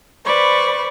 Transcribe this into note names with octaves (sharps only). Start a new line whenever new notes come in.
B4 C5 D5 B5 C#6